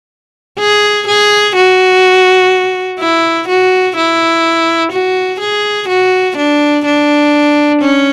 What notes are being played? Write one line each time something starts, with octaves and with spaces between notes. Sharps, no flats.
G#4
G#4
F#4
E4
F#4
E4
F#4
G#4
F#4
D4
D4
C#4